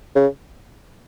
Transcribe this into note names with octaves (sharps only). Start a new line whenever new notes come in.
C#3